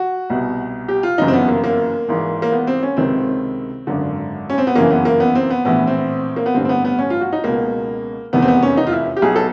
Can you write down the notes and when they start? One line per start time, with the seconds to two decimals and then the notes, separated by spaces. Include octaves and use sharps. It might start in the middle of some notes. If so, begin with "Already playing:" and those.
Already playing: F#4
0.30 C2 B2
0.88 G4
1.03 F4
1.18 G1 F#2 C#3 E3 D#4
1.28 C4
1.34 B3
1.48 A#3
1.64 A#3
2.09 G#1 G#2 E3
2.42 A#3
2.52 B3
2.67 C4
2.83 C#4
2.97 C#2 C3 D#3 C4
3.87 G#1 F#2 D3
4.50 C#4
4.58 C4
4.67 B3
4.75 G1 F#2 C#3 E3 A#3
4.90 B3
5.05 A#3
5.20 B3
5.35 C4
5.50 B3
5.65 A#1 A2 E3 B3
5.87 C4
6.36 A#3
6.46 B3
6.54 A1 G2 D3 C4
6.65 C4
6.69 B3
6.85 B3
6.99 C#4
7.10 F4
7.21 F#4
7.33 D#4
7.44 C#2 B2 A#3
8.33 F1 E2 C3 D#3 B3
8.42 C4
8.48 B3
8.63 C#4
8.77 D#4
8.87 F4
8.92 E4
9.17 G4
9.22 B1 B2 G#4
9.36 A4